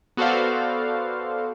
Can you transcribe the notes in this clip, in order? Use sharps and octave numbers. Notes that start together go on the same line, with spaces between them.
B3 F#4 A4 C5 D5 F5